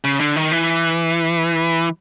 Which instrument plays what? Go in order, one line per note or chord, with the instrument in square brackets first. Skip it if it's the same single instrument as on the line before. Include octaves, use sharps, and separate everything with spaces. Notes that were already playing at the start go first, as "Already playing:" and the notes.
[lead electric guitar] C#3
D3
D#3
E3